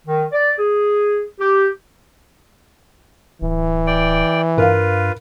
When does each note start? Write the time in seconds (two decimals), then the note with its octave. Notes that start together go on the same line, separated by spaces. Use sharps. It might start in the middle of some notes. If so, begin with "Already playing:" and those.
0.06 D#3
0.32 D5
0.58 G#4
1.38 G4
3.42 D1 E3
3.87 D5 G5
4.58 G2 F4 A#4 B4 F5